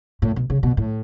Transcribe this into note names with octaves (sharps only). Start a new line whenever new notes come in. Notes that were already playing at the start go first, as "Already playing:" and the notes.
A2
B2
C#3
B2
A2